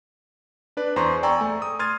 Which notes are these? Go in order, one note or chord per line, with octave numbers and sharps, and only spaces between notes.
D4 B4 D5
E2 C5 A#5 C6 C#6
D5 G5 G#5 A#5 C#6 E6
A3
D#6
C6 F6 G#6 A6 D#7